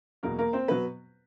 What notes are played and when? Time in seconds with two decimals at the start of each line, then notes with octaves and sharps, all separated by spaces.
0.23 E2 B2 F#3 A#3 A#4
0.38 A#3 A#4
0.53 C4 C5
0.68 B2 F#3 B3 B4